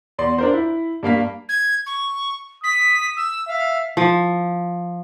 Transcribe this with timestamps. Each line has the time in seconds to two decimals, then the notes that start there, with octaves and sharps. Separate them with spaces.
0.18 E2 D5 C6
0.38 D4 A#4 C5
0.53 E4
1.03 G2 A#3 F5 B6
1.49 G#6
1.86 C#6
2.64 D#6 B6
3.17 E6
3.48 E5 F5
3.97 F3